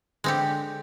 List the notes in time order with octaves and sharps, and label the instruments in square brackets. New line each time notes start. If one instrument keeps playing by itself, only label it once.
[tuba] D3 [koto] G#3 C4 G4